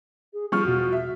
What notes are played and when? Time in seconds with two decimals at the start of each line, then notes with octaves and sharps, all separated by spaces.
0.33 G#4
0.52 F3 G3 G#4 C#6 F6
0.65 E2 B2 F#4
0.92 E5